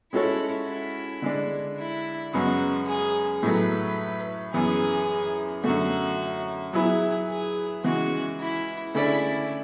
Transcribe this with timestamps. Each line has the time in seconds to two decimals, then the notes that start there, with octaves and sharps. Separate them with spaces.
0.13 G#3 C#4 E4 F#4 A4 C#5
0.67 E4
1.22 D3 G#3 D4
1.78 E4
2.33 F#2 C#3 G#3 B3 F#4
2.87 G#4
3.43 A2 F#3 A3 B4
4.53 F#2 E3 B3 G#4
5.64 F#2 D3 A3 F#4
6.73 F#3 B3 E4 G#4 B4
7.29 G#4
7.84 C#3 E3 G#3 F#4
8.40 E4
8.94 D3 A3 C#4 E4 G#4 D5